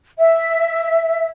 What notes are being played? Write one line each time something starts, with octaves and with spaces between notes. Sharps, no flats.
E5